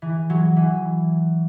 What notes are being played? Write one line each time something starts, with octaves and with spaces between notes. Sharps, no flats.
E3
F#3
E3